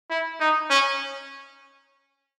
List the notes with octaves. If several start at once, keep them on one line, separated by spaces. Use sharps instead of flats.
E4
D#4
C#4